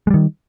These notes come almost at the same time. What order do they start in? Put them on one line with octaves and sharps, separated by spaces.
G#3 G3 D#3